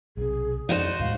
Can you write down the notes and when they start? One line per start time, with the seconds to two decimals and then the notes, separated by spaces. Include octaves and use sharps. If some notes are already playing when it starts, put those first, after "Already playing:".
0.17 B1 C3 G#4
0.69 F2 D#4 F#4 C5 D5
1.00 D#2 A2 G#3 F5